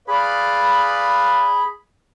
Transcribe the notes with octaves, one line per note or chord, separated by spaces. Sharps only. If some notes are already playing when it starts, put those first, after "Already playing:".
G#4 B4 D5 F5 B5